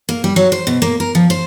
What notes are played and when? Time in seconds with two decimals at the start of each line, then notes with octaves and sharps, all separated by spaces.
0.09 A#3
0.24 G3
0.36 F#3
0.52 C5
0.67 B2
0.82 A#3
1.00 A#4
1.15 F3
1.30 C5